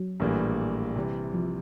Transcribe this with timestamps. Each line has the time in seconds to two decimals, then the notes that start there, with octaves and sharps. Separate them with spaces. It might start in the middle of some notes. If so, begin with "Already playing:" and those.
Already playing: F#3
0.20 A#1 A2 E3 G3 A#3
0.96 C3 E3 G3
1.34 F3